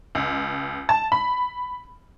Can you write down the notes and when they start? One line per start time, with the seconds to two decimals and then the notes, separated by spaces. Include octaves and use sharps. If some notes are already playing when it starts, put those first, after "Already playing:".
0.15 C#2
0.89 A5
1.12 B5